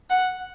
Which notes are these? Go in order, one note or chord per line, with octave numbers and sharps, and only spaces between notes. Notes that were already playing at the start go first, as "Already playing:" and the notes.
F#5